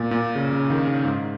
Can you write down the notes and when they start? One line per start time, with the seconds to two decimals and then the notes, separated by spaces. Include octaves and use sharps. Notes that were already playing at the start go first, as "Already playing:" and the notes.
Already playing: A#2
0.11 A#2
0.35 C#3
0.53 C#3
0.70 D#3
0.87 C#3
1.05 G#2